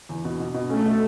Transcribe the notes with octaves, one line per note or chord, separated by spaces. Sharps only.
E2
B2
B2
B2
A3 C#4
B2